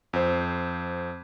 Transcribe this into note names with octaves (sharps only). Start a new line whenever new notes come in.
F2 C5